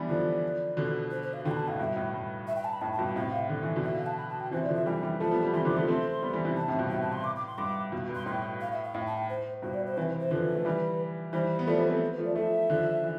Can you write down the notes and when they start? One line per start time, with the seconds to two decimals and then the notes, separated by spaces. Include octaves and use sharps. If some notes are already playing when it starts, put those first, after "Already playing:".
Already playing: E3 G3 B3 D4
0.09 D3 F3 D5
0.77 B2 D3
1.11 C5
1.22 C5
1.33 F5
1.45 B2 D3 G5
1.51 B5
1.57 A5
1.68 A2 F5
1.79 G2 B2 E5
1.96 A2
2.14 G2
2.47 E5
2.56 G5
2.64 A5
2.73 B5
2.81 A2 A5
2.93 A5
2.99 G2 B2
3.04 G5
3.16 A2 C3 F5
3.49 D3
3.63 E3
3.76 B2 D3
3.84 E5
3.95 F5
4.06 A5
4.18 B5
4.29 A5
4.40 G5
4.51 C3 E3 C5
4.63 D5
4.68 D3 F3
4.75 E5
4.86 E3 G3 G5
5.03 E3 G3
5.20 F3 A3 A5
5.31 G3 B3
5.42 G3 B3
5.53 C3 E3 C6
5.65 D3 F3 D6
5.76 F3 A3 C6
5.88 A3 C4
6.22 G3 B3
6.33 E3 G3
6.45 C3 E3
6.56 A5
6.68 A2 C3
6.79 G2 B2
6.90 A2 G5
7.02 A5
7.13 C6
7.24 D6
7.36 D6
7.47 C6
7.58 G2 D6
7.92 G2 B2
8.09 G2
8.15 C6
8.26 A2 G5
8.61 F5
8.72 E5
8.83 F5
8.94 A2 G5
9.06 A5
9.17 G5
9.29 C5
9.62 G2 B2 C5
9.74 D5
9.86 C5
9.97 C3 E3 B4
10.08 C5
10.20 C5
10.31 D3 F3 B4
10.55 A3
10.65 E3 G3
11.33 E3 G3 C5
11.59 B3
11.67 F3 A3 D5
11.78 G3 B3 C5
11.90 A3 C4
12.12 B4
12.18 F3 A3
12.24 D5
12.35 F3 A3 E5
12.69 D3 F3
13.04 E3